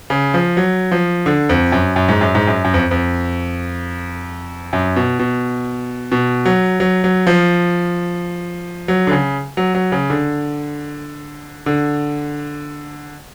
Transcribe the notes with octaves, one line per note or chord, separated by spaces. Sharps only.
C#3
F3
F#3
F3
D3
F2
F#2
F#2
G#2
F#2
G#2
F#2
F#2
F2
F2
F#2
B2
B2
B2
F#3
F#3
F#3
F3
F#3
D3
C#3
F#3
F#3
C#3
D3
D3